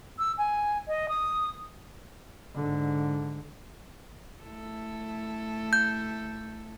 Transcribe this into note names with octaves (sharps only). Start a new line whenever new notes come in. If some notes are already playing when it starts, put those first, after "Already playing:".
E6
G#5
D#5
D#6
G#2 D3
A3 E4 A4
G6